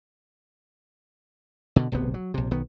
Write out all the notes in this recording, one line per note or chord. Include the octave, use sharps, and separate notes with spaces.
B2 D3
D1 B1 C3 B3
F#3
A#1 C3
B1 D#3 B3